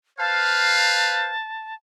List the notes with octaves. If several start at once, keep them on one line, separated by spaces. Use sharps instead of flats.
B4 C5 F5 A5